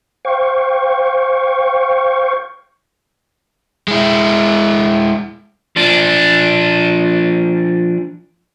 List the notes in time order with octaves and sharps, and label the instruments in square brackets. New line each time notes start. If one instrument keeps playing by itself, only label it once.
[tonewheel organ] C5 F5 G5 C#6
[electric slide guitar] G#3 E4
[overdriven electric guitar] F3 D4